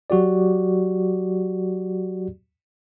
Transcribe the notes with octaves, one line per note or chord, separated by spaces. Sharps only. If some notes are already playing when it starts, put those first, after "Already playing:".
F#3 F#4 G4 D5